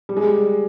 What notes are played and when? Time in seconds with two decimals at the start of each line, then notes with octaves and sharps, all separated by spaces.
0.09 G3
0.17 G#3
0.23 G3